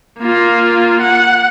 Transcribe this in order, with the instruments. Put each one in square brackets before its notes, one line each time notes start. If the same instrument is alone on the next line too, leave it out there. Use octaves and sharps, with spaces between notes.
[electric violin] A#3 F4
F#5